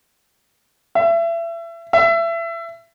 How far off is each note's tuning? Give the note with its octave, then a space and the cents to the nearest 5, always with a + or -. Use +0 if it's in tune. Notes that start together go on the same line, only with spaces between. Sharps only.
E5 +30
E5 +25